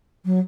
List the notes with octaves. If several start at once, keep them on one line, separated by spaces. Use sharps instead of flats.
F#3